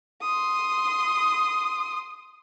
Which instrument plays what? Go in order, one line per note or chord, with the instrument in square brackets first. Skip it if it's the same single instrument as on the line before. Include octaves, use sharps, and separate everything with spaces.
[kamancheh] C6 D#6